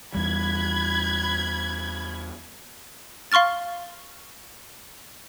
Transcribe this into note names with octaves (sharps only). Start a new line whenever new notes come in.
E2 G3 B5 F#6 G#6
F5 C6 C#6 F6 A6